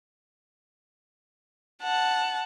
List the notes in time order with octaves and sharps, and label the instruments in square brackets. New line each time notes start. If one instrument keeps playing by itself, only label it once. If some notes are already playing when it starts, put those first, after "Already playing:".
[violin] F#5 A5